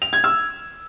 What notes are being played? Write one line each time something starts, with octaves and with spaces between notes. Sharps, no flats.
F7
G#6
E6